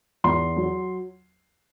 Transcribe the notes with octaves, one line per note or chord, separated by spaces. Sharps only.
E2 C6
F#3